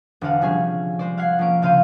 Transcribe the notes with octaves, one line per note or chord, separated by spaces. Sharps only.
E1 D3 D4 D5 F5 F#5
C3 F3 G3 C#4 G#4
G#3 C5 D5
F5 F#5 F#6 G#6 C7
F3 A#3 C#4 D7
D2 C#3 F5 C6 G6 D#7